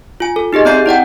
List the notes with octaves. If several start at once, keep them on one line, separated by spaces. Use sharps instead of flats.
F4 G#5
A4
D#4 G4 G#4 D#5
C4 D5 E5 A#5 G6 C7
E4 D5 F#5 G5